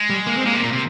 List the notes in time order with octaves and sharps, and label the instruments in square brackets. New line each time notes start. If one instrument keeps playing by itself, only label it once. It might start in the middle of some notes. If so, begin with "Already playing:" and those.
Already playing: [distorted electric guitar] G#3
[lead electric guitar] G3
A#3
C4
[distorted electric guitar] G#3 [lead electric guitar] A#3
[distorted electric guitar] C3
A#2
C3